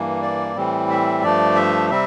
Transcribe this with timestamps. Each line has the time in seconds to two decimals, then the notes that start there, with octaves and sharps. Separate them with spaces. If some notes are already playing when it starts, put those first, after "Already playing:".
Already playing: G2 E3 A#3
0.22 D5
0.56 A2 E3 G3 C4
0.90 E5
1.23 G2 F3 A3 D4 D5
1.56 E5
1.90 C3 G3 C4 E5